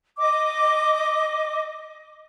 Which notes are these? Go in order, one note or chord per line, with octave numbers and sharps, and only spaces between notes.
D#5 D6